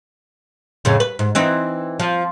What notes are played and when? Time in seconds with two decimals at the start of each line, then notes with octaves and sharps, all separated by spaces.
0.85 F2 A2 C#3
1.00 B4
1.19 G#2
1.35 E3 C4 D#4
2.00 F3